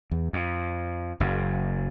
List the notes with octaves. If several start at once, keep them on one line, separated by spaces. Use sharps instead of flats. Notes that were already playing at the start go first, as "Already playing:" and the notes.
E2
F2
F#1 F#2